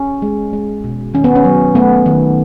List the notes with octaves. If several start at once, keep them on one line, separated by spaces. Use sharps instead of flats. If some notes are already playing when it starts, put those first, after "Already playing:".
Already playing: C#4
G#3
G#3
B2
D#3 C#4
B3
C#4
F#3
A3 B3
D#3